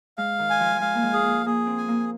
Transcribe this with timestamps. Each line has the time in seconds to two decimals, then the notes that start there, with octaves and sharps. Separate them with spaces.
0.18 G#3 F5
0.39 D#3
0.50 G#5
0.60 F3
0.75 F3
0.81 G#3 F5
0.95 A#3
1.03 G#3
1.13 G#4
1.24 A#3
1.46 A#3 G#4
1.67 C4
1.78 G#5
1.88 A#3